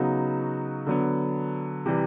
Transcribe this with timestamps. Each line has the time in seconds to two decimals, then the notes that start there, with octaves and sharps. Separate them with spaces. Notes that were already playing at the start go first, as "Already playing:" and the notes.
Already playing: C#3 F#3 B3 D#4 F#4
0.87 D3 F#3 B3
1.86 C3 E3 G3